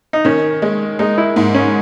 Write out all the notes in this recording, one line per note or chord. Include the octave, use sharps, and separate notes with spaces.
D#4
D#3 C#4
G#3
G#3 D#4
E4
G#2
C#4